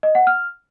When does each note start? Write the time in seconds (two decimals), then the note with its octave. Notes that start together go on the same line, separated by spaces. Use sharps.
0.03 D#5
0.15 F#5
0.27 F6